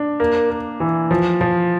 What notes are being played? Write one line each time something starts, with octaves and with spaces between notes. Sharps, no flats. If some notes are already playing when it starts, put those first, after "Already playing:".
Already playing: D4
A#3
A#3
E3
F3
F3